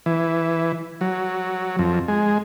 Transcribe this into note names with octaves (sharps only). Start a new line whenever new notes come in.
E3
F#3
F2
G#3